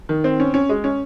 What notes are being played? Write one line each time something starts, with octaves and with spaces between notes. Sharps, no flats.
D#3
C4
C#4
C#4
G#3
C#4